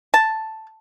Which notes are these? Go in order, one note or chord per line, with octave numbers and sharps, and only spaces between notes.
A5